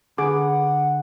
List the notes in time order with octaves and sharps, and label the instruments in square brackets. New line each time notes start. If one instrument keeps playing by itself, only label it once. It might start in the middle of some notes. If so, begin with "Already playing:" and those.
[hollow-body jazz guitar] D3 B4 [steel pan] G#4 D6 [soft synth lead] F#5